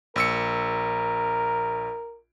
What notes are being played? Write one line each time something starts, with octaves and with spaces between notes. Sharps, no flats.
A#1 A#4 E6 C#7